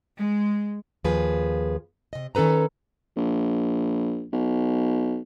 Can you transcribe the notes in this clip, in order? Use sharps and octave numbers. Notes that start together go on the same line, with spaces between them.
G#3
D#2 F3 G#4 B4
C3 D#5
D#3 C#4 A4 B4 A#5
A#1
B1